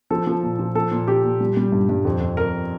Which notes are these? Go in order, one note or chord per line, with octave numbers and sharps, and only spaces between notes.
F3 A4
F3
A#2
F3
F3 A4
A#2
F3 G4
A#2
G3
G3
G2
G2
F2
F2
F2 A#4